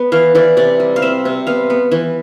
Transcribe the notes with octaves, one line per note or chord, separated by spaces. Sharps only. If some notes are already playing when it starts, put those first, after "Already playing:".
Already playing: B3
E3 F5
E3 D5
C3 D5
G3
F5
C4 E5
C3
B3 F5
B3
E3